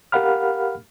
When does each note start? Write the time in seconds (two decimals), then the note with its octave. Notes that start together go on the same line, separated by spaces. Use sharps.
0.12 G4 A#4 F5 F#5 B5 F6